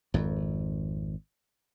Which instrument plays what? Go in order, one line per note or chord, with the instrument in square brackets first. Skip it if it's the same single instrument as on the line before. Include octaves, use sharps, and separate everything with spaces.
[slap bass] G#1 F2